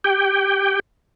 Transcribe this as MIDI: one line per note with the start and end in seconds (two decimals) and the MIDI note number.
0.04 0.80 67
0.04 0.80 79